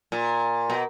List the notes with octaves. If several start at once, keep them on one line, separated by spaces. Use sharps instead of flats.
A#2
B2